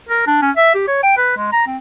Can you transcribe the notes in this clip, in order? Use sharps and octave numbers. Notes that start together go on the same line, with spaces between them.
A#4
D4
C#4
E5
G4
C#5
G5
B4
G#3
A#5
C4